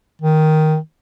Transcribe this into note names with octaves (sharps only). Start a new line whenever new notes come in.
D#3